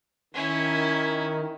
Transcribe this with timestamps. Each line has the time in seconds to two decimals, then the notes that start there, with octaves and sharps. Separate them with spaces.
0.34 D#3 C#4 E4